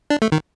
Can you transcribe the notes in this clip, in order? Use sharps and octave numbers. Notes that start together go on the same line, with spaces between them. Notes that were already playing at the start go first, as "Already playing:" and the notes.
D4
A3
D#3